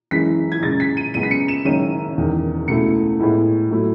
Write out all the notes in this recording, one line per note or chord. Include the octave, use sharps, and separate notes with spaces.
F#1 F#2 E3 G#3 B6
G#6
F#2 C#3 G#3 A6
B6
D#7
F#2 C#3 G#3 B3 D#7
B6
C#7
E7
F#1 F#2 D#3 G#3 C#4 D#7
E1 E2 D#3
C#2 B2 A3 E4 C#7
A2 G#3 B3 E4
A2 F#3 A3 E4